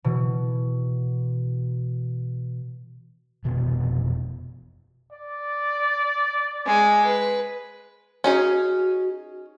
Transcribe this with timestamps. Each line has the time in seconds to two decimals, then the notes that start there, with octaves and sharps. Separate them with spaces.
0.04 B2 E3
3.45 F1 B2 B3
5.12 D5
6.66 G#3 G#5
7.05 B4
8.24 C#4 D#4 F#4 G#4